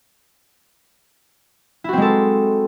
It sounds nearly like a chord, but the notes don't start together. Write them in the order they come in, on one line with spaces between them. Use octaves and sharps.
E4 F#4 C4 G#3 A4